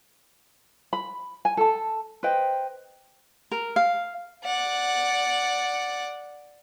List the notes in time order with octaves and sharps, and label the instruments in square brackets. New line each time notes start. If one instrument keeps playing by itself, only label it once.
[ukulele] B5
G#5
A4 A5
B4 C5 D#5 G5
[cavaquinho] A#4
F5
[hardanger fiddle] D5 F#5